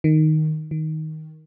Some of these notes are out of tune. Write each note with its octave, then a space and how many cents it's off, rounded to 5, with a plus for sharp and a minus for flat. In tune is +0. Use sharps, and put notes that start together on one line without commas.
D#3 +0
D#3 +10